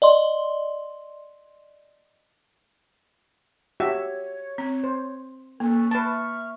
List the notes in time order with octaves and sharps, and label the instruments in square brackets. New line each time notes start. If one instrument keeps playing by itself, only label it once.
[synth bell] D5 D#5 C6
[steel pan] F#4 G4 E5 [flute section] C#5
[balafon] C4
[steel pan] C5
[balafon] A#3 [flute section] C#4 A4 B4
[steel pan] B4 A5 [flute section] E5 C#6 F6